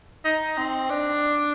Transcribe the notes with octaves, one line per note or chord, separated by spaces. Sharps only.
D#4
C4
D4